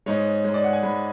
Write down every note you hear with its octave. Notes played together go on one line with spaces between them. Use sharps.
G#2 G#3 C#5
G#2 G#3
D5
F#5
G#5
G#2 G#3 B5